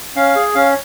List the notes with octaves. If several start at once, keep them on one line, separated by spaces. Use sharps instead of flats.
C#4 F5
G#4
C#4 F5